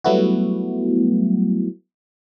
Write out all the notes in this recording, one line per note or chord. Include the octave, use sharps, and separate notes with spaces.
F#3 G3 A3 B3 E4 F#4